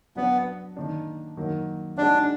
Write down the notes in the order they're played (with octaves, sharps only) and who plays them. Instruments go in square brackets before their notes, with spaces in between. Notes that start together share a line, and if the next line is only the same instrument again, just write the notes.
[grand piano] F#3 D4 F#4 D5 [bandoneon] B3
[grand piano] D#3 A#3 D4
D#3 F#3 A#3
[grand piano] G#3 D#4 F#4 D5 [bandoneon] D4